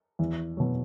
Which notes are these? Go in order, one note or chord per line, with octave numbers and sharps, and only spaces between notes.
E2
B2 F#3